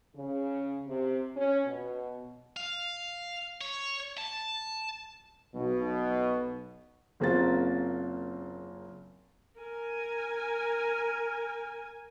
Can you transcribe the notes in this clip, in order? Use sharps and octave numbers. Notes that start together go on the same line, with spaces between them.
C#3
C3
C#4
B2
F5
C#5
A5
B1 B2
F#1 C#3 A#3 C4 F4 A6
A#4 G#5